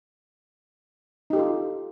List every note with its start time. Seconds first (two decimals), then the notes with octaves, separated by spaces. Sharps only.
1.30 D#4
1.33 G4
1.36 A4
1.39 F4